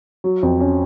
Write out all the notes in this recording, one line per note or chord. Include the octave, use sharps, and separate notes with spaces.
F#3
F2
C#4